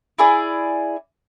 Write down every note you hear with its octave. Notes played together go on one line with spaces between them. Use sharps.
E4 G#4 D5